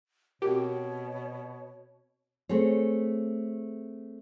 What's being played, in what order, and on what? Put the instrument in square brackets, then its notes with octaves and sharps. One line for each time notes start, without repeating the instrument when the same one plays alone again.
[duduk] B2 [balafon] C4 F#4 A#4 [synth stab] G4 [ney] C#5
[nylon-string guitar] A3 C4 G#4 C#5